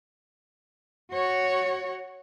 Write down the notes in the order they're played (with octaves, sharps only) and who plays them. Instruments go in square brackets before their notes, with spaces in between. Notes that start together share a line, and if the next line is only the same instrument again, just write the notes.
[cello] F#4 C#5